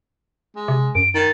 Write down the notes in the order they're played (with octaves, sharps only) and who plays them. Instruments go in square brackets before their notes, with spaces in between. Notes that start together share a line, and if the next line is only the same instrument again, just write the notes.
[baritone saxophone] G#3
[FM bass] C3
[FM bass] F#2 [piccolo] D7
[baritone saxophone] D#3 [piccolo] A6